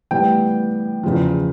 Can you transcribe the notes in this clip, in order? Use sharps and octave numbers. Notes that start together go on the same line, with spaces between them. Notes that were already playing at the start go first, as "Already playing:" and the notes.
A2 E3 G3 B3 G5
E2 C#3 F3